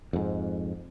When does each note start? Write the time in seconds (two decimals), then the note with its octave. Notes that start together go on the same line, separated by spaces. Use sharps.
0.13 F2 G#2